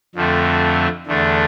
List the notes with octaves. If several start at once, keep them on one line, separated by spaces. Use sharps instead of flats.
F2 D3 F3 A3 C4
E2 D3 A3 D4